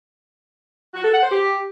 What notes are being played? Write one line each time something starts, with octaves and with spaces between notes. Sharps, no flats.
F#4
A4
F#5
C5
G4